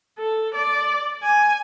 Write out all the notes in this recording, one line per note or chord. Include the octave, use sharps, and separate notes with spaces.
A4
D5
G#5